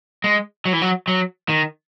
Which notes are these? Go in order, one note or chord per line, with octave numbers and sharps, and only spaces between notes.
G#3
F#3
E3
F#3
F#3
D#3